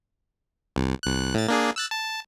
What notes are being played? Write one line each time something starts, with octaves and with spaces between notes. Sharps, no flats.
C2
C2 F#6
A2 A6
A#3 D4 G#4
E6 F#6 A6
A5